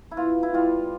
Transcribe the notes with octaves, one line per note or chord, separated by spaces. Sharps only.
E4
B3 F4
E4
G3 F4